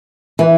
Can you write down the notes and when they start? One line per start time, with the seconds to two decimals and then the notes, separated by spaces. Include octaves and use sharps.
0.39 E3